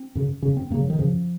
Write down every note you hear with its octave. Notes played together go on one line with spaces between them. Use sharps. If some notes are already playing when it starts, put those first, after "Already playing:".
Already playing: C4
F#2 C#3
C#3 C#4
F#2
C4
F#2 C#3 A#3
F#3
D#3
F#2 C#3 F3